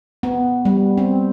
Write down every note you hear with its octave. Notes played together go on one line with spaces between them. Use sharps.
B3
G3
C4